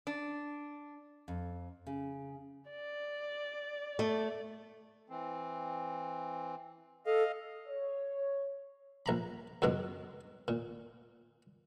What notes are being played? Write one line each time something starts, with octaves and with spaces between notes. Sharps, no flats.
D4
F2
C#3
D5
A3
E3 C4
A4 D#5 F5
C#5
A#1 A#5 B5
C#2 F#2 B2 G#3 C#4
A#2